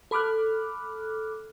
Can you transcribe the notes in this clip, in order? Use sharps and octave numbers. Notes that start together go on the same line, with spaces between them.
A4 B5 D6 F6 F#6